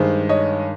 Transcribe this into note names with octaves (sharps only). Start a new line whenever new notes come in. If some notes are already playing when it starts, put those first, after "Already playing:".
Already playing: G2 D#3 G#3 C5
C#5 D#5